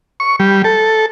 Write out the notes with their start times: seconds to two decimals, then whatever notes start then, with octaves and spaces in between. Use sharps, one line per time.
0.20 C#6
0.40 G3
0.64 A4